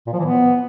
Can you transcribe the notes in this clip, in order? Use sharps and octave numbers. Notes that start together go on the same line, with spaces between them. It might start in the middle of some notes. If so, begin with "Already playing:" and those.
A#2
F3
E3
B3